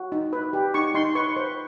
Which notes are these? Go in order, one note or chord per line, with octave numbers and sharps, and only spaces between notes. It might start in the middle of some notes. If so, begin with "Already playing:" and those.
Already playing: F#4
D#4
B4
G4
D#4 C#6
D#4 C6
B4 C#6
C5